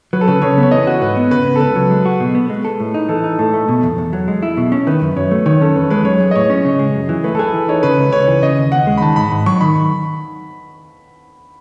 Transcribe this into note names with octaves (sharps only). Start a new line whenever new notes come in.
F#3 B4
A4
C#3 B4
C#3 C#5
B3
C#5
E3 D#5
F#4
G#2 B4
B3
C#3 B4
B3
A4
C#2 B4
F#3
G#3
F#4
B2
B3
G#3
A4
A2
D#4
E3 A4
D#4
A2 A4
A3
B2
E2
E2
F#3
G#3
E4
B2
C#4
D#3 B4
F#2
F#2 C#5
A3
D#3 C#5
C#4 A4
E2 B4
G#3 B4
F#3 C#5
G#4
D#5
A2 C#5
C#4
C#3
G#3
F#2
E3
A3 B4
A4
G#4 B4
E3
D#4 C#5
C#3 B4
C#2
C#2 C#5
E3
C#3 D#5
D#2
D#2 F#5
G#3
B5
D#3 A5
G#2 B5
G#2 B5
F#3 C#6
D#3 B5